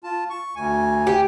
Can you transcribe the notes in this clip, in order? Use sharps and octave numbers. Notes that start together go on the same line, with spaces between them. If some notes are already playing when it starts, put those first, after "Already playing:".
F4 A5
C#6
D2 G#5
G4